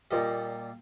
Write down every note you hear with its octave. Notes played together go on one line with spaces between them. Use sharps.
A#2 G3 D#5